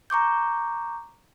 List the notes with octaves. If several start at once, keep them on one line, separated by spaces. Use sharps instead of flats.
A#5 C#6 D6 G6